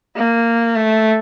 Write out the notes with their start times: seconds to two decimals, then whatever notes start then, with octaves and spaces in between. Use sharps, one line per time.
0.16 A#3
0.75 A3